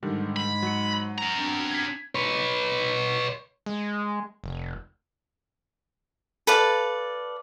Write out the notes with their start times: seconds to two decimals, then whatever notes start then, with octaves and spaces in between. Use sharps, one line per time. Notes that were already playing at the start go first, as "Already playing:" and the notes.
0.03 G#2 D3 D#3 G3 G#3
0.36 B5
0.62 F#3 C#7
1.18 C#4 A#5
1.35 B3 C4 D4
1.71 G#6 B6
2.15 B4 C#5
3.66 G#3
4.44 F1
6.47 A4 B4 D5 F5